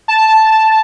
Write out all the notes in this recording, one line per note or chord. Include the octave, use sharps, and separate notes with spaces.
A5